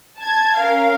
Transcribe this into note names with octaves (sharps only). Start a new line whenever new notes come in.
A5 G#6
C#4 A#4 F5